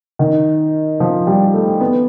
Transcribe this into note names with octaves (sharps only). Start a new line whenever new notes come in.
D#3
F3
G3
A3
B3